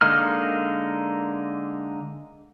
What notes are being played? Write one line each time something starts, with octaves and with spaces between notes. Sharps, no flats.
D3 G#3 A#3 D#4 F6